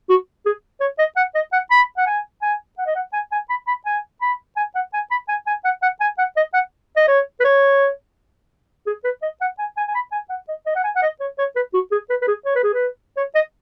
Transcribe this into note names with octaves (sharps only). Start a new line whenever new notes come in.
F#4
G#4
C#5
D#5
F#5
D#5
F#5
B5
F#5
G#5
G#5
F#5
D#5
F#5
G#5
G#5
B5
B5
G#5
B5
G#5
F#5
G#5
B5
G#5
G#5
F#5
F#5
G#5
F#5
D#5
F#5
D#5
C#5
B4
C#5
G#4
B4
D#5
F#5
G#5
G#5
G#5
B5
G#5
F#5
D#5
D#5
F#5
G#5
F#5
D#5
C#5
C#5
B4
F#4
G#4
B4
B4
G#4
C#5
B4
G#4
B4
C#5
D#5